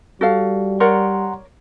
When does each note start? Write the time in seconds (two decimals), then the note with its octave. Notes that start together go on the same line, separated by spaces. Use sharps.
0.21 G3 F#4 A4 F5
0.80 A#4 C#5 D5 F#5 A#5 C6